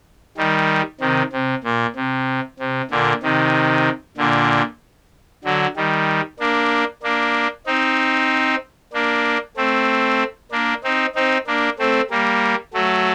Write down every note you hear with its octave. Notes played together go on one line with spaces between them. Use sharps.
D#3 G3
C3 D#3
C3
A#2
C3
C3
A#2 D3
C3 D#3
A#2 D3
D3 F#3
D#3 G3
A#3 D4
A#3 D4
C4 D#4
A#3 D4
A3 C4
A#3 D4
C4 D#4
C4 D#4
A#3 D4
A3 C4
G3 A#3
F#3 A3